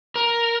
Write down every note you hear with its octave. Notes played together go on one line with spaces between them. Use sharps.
A#4